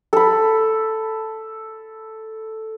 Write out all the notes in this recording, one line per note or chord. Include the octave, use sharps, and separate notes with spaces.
A4 B5